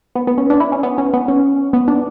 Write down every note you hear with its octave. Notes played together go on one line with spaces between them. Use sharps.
B3
B3
C#4
D4
E4
C#4
B3
C#4
B3
C#4
B3
D4